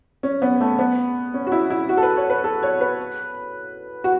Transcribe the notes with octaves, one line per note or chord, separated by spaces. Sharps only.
C#4
B3
A3
B3
C#4
F#4
E4
E4
F#4
A4
B4
C#5
B4
A4
C#5
B4
F#4